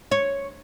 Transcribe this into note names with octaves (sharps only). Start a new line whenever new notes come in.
C#5